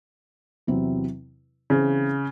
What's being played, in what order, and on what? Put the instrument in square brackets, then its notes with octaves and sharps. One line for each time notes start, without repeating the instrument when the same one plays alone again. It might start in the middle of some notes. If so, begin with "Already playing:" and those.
[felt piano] E2 C3 F#3 C4 E4
[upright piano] C#3 [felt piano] E3 C4 E4 C5